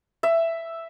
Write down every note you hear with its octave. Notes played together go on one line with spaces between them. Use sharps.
E5